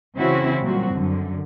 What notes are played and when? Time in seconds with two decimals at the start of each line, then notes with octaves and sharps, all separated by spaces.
0.16 C#3 E3 C4 C#4 E4 F#4
0.62 A#2 F#3 G3 C4 F#4
0.94 F#2 D3